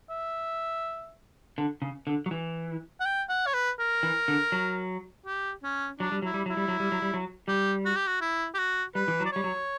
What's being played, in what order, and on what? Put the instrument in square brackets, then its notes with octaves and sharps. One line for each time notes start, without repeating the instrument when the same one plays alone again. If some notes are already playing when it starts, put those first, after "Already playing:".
[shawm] E5
[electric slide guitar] D3
C#3
D3
F#3
E3
[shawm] F#5
G5
F#5
C#5
B4
A#4
[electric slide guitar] E3
D3
F#3
[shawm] G4
C#4
[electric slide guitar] F#3 [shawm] D4
[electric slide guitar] G3
[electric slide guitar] F#3 [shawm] E4
[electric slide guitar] G3
[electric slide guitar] F#3 [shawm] E4
[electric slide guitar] G3
F#3
G3
F#3
G3
F#3
[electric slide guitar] G3 [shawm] G4
[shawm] F#4
G4
F#4
E4
G4
F#4
[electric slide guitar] G3 [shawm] B4
[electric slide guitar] E3
F#3
[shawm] D5
[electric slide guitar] G3 [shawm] C#5
[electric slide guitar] F#3